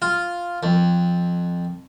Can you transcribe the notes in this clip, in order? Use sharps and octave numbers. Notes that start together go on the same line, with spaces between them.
F4
F2